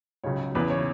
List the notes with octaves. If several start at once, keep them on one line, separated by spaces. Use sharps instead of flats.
C#2 C#3 F#3 C#5
E2 C#3 E3 B4
C#5